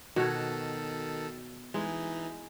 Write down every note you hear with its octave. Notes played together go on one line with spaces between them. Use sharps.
B2 D#3 F#4 A4 C#5
E3 G#3 D#4